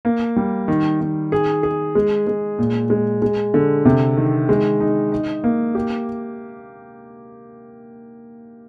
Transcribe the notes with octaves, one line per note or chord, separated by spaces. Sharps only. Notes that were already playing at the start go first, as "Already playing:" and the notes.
A#3
G3
D#3
D#3
G#4
G#4
G#3
G#3
A#2
G#3
G#3
D3
C3
D#3
G#3
D#4
D#4
A#3
G4